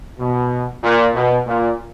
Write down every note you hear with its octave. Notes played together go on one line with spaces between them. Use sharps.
B2
A#2
B2
A#2